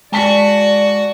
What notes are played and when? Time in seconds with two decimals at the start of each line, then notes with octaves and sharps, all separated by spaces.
0.12 G#3 F#4 D5 G#5 A5 C#6 B6